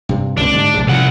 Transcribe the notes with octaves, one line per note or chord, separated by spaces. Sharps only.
G2 C3
C#2 B2 C4 D4
G#2 D3 G3
A#1 C3 G#3
C2 C#3 F3 F#5